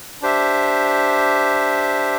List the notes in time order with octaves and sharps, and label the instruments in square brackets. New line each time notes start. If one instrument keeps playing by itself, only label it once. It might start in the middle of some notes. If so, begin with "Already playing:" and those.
[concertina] D4 G4 C5 E5